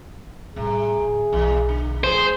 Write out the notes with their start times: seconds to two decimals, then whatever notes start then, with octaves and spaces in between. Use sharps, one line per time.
0.56 A2 C3 G3 G#4
1.01 A2 D3
1.33 B1 E2
1.69 D3
2.04 F3 A3 C4 G#4 C5